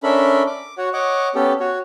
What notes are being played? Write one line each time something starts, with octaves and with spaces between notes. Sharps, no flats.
C#4 D4 A4 A#4 E5 B5
D6
F#4 C#5 F#5
C#5 D#5 F#5 D6
B3 C#4 G4 A4
F#4 C#5